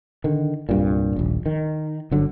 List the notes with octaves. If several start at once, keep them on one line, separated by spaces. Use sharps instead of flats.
D3 D#3
C2 G2 A#2
D#1 A#1
D#3
G1 D3 F#3